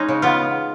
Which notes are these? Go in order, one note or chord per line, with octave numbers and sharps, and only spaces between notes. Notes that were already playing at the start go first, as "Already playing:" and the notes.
Already playing: G#3 C#4 D#4
C#3
B3 F4